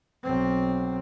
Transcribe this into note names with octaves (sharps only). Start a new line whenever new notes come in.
B1 C4